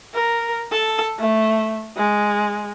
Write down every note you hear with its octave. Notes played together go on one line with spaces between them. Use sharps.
A#4
A4
A3
G#3